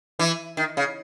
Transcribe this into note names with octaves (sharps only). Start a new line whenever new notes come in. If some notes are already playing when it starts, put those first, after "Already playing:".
E3
D#3
C#3